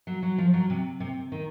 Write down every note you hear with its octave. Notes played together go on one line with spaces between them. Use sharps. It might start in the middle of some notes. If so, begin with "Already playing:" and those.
F#3
F#3
F3
F#3
C3
C3
D#3